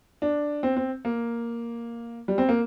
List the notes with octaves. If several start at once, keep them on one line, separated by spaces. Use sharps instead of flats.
D4
C4
C4
A#3
G3
C4
A#3